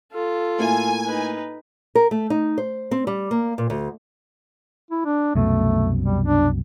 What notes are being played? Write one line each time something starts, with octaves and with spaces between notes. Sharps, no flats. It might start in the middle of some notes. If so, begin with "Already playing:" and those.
F4 A4
A2 A#3 E4 G#5
D#4 B4
A#4
A3
D#4
C5
C4
G3
A#3
A#2
D2
E4
D4
C2 F#2 B2 A3
G3
D4